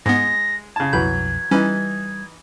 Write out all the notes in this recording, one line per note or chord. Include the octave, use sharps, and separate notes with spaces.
G#2 G#3 B3 A#6
C#3 A5 G#6
B1 F2 E3 F#3 B5 G6
E3 G3 C#4 D#4 B4